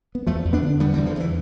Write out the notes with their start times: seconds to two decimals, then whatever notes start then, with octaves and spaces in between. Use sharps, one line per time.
0.15 B3
0.27 E2 F3 A3
0.45 E2
0.53 B3 D4
0.62 D3
0.80 D3 G3 B3
0.93 E3 G3
0.98 E2
1.06 D3 F3
1.16 E2 E3